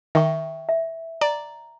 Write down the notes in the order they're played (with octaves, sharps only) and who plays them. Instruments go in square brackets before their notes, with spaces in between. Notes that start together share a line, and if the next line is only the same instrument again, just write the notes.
[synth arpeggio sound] D#3 [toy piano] E5 G5 C#6
[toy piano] E5
[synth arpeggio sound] D5 [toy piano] A#5